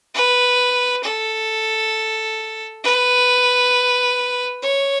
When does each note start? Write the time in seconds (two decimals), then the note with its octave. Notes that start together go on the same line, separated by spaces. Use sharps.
0.15 B4
1.03 A4
2.83 B4
4.63 C#5